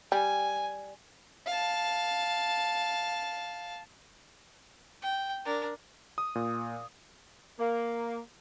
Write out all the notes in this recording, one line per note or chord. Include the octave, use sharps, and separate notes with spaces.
G3 G#5
F5 A5
G5
D4 A#4
D#6
A#2
A#3